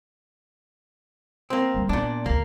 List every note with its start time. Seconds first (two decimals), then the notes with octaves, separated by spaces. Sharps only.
1.50 A#3 C4
1.74 G3 A3
1.89 A#2 B3 D4
2.26 D2 C#3 A#3